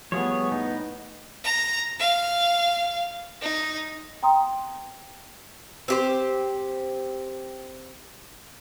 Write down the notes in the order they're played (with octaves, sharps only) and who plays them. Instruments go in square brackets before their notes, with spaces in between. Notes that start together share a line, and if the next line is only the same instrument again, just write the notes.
[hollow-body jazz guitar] F3 G3 A3 [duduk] B3 [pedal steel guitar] G#4 C#5
[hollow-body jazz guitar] A2 [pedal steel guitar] D#4
[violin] A#5
F5
D#4
[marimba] G5 A#5 C6 D#6
[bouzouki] C4 G4 C5